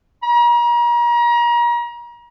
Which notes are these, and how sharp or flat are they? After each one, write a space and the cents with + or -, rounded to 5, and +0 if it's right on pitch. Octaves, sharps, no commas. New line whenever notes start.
A#5 +35